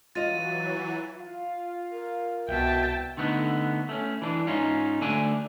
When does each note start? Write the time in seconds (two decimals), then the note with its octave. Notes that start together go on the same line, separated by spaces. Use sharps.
0.15 E3 F#3 F4 D#5 A6 D#7
1.18 F4
1.91 A#4
2.49 C2 B2 E5 G5 A5
3.17 D3 A3 B3 D#4
3.89 A3 C#4
4.22 E3 D4
4.47 G#2 C#4 D#4 F4
5.01 D2 D3 A3 D4 D5 G#5